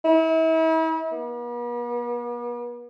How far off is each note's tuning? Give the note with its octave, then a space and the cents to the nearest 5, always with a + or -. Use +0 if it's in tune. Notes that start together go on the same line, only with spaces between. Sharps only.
E4 -40
B3 -45